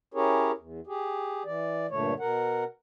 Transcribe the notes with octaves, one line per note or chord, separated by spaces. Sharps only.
C#4 E4 G4 G#4 A#4 C#5
E2
G4 G#4
E3 D5
G2 A#2 D3 A3 C#5
B2 A#4 F#5